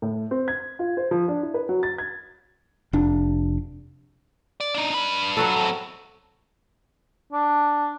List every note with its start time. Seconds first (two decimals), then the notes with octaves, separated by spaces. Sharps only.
0.02 A2
0.31 C4
0.48 G#6
0.79 F4
0.97 C5
1.11 F3
1.28 D4
1.43 E4
1.54 B4
1.69 F#3
1.83 A6
1.98 G#6
2.93 F1 D4
4.60 D5
4.75 D4 D#4
4.94 D4 B4
5.37 F#3 F#4 A4
5.56 A2 C4
7.33 D4